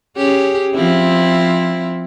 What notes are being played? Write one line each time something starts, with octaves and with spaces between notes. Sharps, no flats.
C#4 G4 G#4
F3 C4 E4